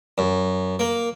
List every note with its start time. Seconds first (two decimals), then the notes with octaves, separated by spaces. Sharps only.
0.18 F#2
0.79 A#3